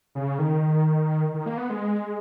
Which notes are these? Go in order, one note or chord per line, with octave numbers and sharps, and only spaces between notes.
C#3
D#3
D#3
A#3
B3
G#3